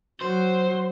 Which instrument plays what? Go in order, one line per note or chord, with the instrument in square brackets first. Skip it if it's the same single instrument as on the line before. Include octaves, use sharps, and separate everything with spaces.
[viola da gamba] F#3 [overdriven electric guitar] C5